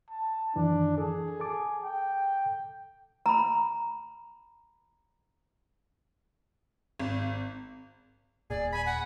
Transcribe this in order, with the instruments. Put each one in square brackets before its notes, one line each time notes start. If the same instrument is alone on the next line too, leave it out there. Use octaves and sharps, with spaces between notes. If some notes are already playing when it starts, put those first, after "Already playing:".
[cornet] A5
[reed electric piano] F#2 D#3 E3 [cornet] D4
[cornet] G#4 [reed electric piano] A4
[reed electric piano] A4 A5 D6
[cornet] G5
[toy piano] A#5 B5
[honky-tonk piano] G#1
[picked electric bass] D#1 A#2 [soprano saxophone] G#4 [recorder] D5
[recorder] G#5 [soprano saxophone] B5
[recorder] F#5